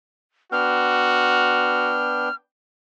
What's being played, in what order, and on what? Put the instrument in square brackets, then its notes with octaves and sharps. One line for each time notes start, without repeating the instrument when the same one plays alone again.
[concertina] B3 D4 G5 [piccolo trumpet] F#4 [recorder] F6